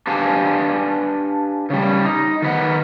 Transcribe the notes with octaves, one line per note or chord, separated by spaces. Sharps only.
D4 G4 B4 F5 G#5 A5
C#3 G3
D#4
D#3 B4 F#5